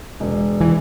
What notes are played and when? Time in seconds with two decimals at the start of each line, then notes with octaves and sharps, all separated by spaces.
0.20 E1
0.61 E3